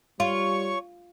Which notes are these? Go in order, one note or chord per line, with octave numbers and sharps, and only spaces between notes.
G3 F4 C#5 C#6